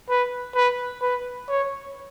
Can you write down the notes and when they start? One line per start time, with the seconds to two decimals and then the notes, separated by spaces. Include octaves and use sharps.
0.10 B4
0.55 B4
1.02 B4
1.49 C#5